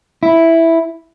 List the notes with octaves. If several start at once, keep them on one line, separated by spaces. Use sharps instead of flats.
E4